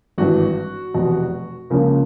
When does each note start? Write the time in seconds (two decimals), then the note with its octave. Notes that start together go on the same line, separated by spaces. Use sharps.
0.18 G#1 G2 E3 F#4
0.94 F1 E2 B2
1.70 C#2 C#3 F3 A#3 C#4 A#4